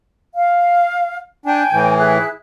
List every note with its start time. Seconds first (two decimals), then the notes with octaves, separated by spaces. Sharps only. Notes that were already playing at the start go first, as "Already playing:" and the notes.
0.35 F5
1.46 D4 G5 G#5
1.73 A2 E3
1.97 E4 G#4 F#6